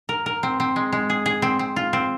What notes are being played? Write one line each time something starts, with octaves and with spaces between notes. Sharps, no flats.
A#4
A#4
C4
C4
G#3
G#3
G#4
G#4
C4
C4
F4
C4